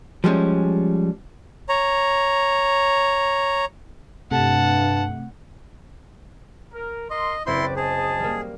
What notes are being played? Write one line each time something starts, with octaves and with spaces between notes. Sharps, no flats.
F3 G3 G#3 C#4
C#5 A#5
G2 C3 A3 F#5 A5
A#4
A#4 D#5 C6
F#1 C4 E4 B4 D5 C6 G6
G#4 D#5 A5
G3 A#3